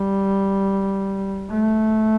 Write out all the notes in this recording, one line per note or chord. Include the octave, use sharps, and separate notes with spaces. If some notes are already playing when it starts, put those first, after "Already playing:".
Already playing: G3
A3